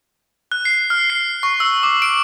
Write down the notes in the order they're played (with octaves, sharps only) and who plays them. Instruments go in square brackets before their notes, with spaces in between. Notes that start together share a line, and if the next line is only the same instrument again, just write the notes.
[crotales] F#6
C7
F6
C7
C#6
E6
D6
D7